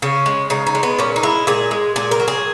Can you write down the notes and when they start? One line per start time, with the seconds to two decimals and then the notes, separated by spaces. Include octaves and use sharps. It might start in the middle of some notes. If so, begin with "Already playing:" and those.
0.02 C#3 C#4
0.26 G#3
0.50 C#3 D#4
0.67 D#4
0.75 G#3
0.83 B3
0.99 A#2 C#4
1.16 D#4
1.23 G#3 E4
1.47 A#2 G#4
1.71 G#3
1.96 A#2 G#4
2.11 A#4
2.20 F#3
2.28 G#4